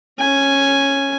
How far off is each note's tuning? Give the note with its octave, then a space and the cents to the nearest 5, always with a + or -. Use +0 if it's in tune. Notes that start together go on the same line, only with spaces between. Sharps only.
C#4 -10 G#5 +0